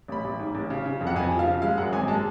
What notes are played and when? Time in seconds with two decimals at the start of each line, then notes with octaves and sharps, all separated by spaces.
0.08 A1 B5
0.24 A1
0.39 G#2
0.55 A1
0.70 C#3
0.86 C#3
1.01 F2
1.07 F#5
1.15 F2 G#5
1.31 F3
1.39 F5
1.47 C#3
1.62 G#3 F5
1.78 F#2 F#5
1.93 G#1 G#5
2.08 G#3 A5